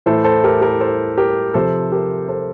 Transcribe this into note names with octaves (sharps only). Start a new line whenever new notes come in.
A2 E3 A4 C5
A4 C5
G4 A#4
G4 A#4
A4 C5
G4 A#4
C3 F3 A4 C5
G4 A#4
A4 C5